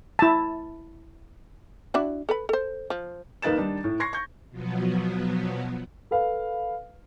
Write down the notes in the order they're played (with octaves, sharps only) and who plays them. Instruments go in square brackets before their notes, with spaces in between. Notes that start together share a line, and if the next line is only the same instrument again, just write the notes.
[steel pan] E4 A5
[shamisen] D4 E4 F#4
A4 B4 B5
A4 C5
F3
[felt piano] D#2 A#3 D#4 B4 A6 E7
D#3 G3 D4 D#4
A2
C6 C#6 G#6 A#6 C7
C#6 G6
[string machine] B2 F3 F#3 B3
[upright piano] A4 B4 F5